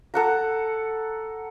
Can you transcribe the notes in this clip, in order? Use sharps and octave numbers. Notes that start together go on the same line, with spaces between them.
A4 F#5 A#5